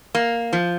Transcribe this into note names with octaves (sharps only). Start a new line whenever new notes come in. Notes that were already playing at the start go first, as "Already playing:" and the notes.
A#3
F3